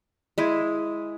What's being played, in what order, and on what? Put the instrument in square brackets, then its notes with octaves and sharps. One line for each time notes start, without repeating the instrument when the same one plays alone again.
[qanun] G#3 E4 G#4